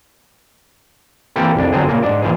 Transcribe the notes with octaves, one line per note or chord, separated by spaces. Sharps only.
E3 A#3 C4 G4 A4
C2 F2 D4
G1 D3 F#3 C4 D4 G#4
A#2 C#3 A#3
G#2 D4 D5
A#2 E3 F3 G#4